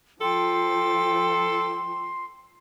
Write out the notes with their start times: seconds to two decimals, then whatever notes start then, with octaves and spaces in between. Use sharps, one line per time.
0.21 F3 A4 G5 C6